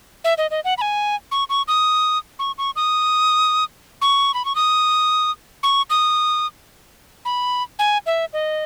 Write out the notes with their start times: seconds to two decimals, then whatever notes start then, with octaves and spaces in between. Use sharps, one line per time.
0.24 E5
0.38 D#5
0.51 D#5
0.64 F#5
0.78 B5
0.81 G#5
1.32 C#6
1.50 C#6
1.68 D#6
2.39 C#6
2.58 C#6
2.76 D#6
4.02 C#6
4.34 B5
4.45 C#6
4.55 D#6
5.63 C#6
5.90 D#6
7.25 B5
7.79 G#5
8.06 E5
8.33 D#5